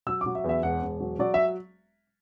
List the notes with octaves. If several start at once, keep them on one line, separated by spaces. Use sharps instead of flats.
F#3 E6
F#3 D6
E5
E2
E5
E1 F#5
E1
F#3
F#3 D5
E5